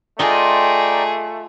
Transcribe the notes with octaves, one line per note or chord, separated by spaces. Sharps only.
A3 F4 G#4 D5 D#5 G5 A#5